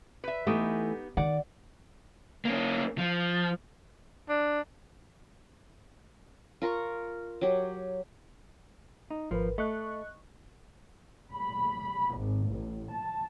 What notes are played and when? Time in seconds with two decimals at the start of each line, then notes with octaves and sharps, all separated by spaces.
0.24 B4 E5
0.47 E3 A3 B3 D#4 G4
1.17 D#3 D5 F#5
2.45 A#3 C#4
2.98 F3
4.29 D4
6.62 F4 A#4 A#5 C#6
7.41 F#3 G4
9.10 D#4
9.31 G#1 F3 A#4 B4
9.58 A3 D#5 C#6 F#6
11.31 B5
12.17 G#1
12.48 A1
12.93 A5